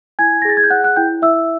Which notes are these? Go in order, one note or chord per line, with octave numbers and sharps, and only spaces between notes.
E4 G#5 G#6
A#6
G#4 A6
G#6
G6
C#5 F#5 F#6
F#5 F#6
E4 G5 G6
E4 E5 E6